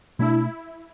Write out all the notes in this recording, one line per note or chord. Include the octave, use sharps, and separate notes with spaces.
B2 A3 D4 E4